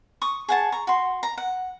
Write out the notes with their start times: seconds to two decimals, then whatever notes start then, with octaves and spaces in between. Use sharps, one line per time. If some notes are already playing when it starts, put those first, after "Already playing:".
0.22 C#6 D#6
0.48 G#4 F#5 A5
0.72 A#5 C#6
0.87 F#4 C6
1.23 A#5
1.38 F#5